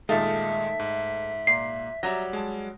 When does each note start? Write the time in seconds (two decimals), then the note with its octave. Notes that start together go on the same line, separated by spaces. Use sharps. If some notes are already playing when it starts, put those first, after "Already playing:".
0.09 A#2 D#3 G#3 A3 D#4 E5 F5
0.79 G#2
1.47 A#2 C7
2.03 F#3 G3 E5 A#5 A#6
2.33 G#3 A5